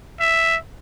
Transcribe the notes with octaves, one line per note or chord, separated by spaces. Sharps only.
E5